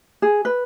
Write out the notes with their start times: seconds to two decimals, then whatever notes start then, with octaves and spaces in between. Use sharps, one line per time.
0.22 G#4
0.45 B4